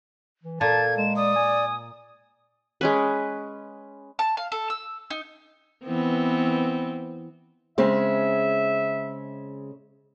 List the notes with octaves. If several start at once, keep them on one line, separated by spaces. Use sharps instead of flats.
E3
A#2 A4 A5 G#6
G#3 E7
D5 D#6
G#5
G#3 C#4 B4
A5
F5
A4
E6
D#4
E3 B3 C4
C#3 G#3 C4 E5